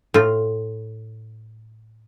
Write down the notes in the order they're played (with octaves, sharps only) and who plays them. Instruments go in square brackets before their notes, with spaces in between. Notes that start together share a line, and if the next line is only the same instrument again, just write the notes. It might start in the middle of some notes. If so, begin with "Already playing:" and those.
[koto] A2 F4